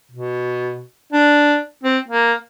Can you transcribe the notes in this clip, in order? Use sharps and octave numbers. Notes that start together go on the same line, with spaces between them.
B2
D4
C4
A#3